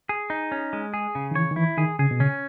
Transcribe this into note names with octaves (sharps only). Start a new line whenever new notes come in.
G#4
D#4
C#4
G#3
G#4
C#3
D#3
E3 C#5
D#3
E3 E4
D#3 G#4
C#3 G#4
B2
C#3 C#4